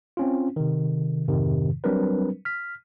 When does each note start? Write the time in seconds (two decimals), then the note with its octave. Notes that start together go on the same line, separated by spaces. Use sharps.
0.17 C4 C#4 F4
0.56 C3 D#3
1.28 F2 G#2 C3 D#3
1.84 F#3 G3 C4 D4 A#4 B4
2.45 F6 B6